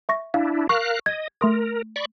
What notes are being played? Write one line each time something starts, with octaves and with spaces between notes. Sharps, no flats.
E5 C#6 A#6
D4 E4 F5
A#4 F5 C#6 F#6
D#5 G#6
A3 A#4 C6 D#6
D5 B5 C#6